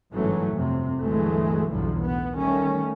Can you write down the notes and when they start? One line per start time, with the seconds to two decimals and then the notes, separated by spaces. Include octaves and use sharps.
0.13 G1 G#2 E3 F#3 A3 C#4
0.50 G1 F2 C3
0.99 G1 D2 E3 F#3 G#3 A3
1.70 B1 E2 G2 D3 E3 F3
2.02 A2 B3
2.32 D#3 G3 A3 C#4